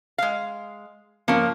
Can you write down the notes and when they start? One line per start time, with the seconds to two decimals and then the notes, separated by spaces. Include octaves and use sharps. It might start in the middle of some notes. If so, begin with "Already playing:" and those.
0.18 G#3 F5
1.28 F3 A#3 C#4